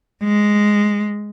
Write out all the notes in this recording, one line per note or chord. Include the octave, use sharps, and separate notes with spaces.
G#3